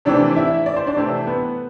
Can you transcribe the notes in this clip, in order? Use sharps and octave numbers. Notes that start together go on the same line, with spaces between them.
C3 E3 A3 C4 D4 D5
E4 E5
D5
C5
D4 D5
C3 E3 A3 C4 C5
B3 B4